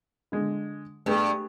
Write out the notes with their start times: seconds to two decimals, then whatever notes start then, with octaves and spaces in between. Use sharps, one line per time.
0.32 D3 G#3
1.06 G2 A3 G#4 B4